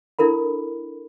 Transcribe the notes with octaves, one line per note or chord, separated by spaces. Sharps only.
D4 E4 A4 A#4 B5